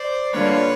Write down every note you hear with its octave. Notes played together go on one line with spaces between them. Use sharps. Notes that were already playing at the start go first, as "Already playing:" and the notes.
Already playing: C5 D5
D3 G3 A#3 D4 F4 B4 C#5